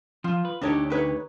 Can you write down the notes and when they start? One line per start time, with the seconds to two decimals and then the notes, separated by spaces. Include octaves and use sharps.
0.24 F3 F4
0.45 B4
0.61 D2 D3 D4 D#4 G4 C#5
0.90 D#4 B4 C#5